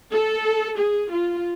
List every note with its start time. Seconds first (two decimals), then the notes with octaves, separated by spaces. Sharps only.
0.11 A4
0.77 G#4
1.10 F4